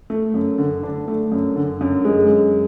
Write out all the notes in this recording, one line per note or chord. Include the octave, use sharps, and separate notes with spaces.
A3
F#2
D3
D4
A3
F#2
D3
F#2
G#3
F#2